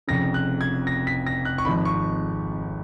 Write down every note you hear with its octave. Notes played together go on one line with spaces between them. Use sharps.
F1 F2 C#3 A#6
F#6
G#6
A#6
B6
A#6
F#6
C#6
G#1 G#2 F3 B5
C#6